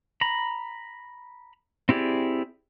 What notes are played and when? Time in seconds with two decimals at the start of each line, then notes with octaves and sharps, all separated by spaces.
0.21 A#5 B5
1.89 C4 E4 G4 G#4 D5